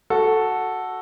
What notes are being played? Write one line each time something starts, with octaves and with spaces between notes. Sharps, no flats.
F#4 A4